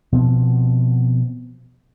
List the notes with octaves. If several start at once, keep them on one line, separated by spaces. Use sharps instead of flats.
B2 F3 C4